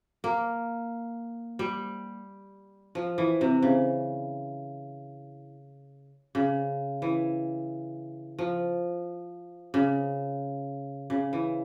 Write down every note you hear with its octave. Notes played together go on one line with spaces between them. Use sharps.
A#3
G3
F3
E3
C3
C#3
C#3
E3
F3
C#3
C#3
E3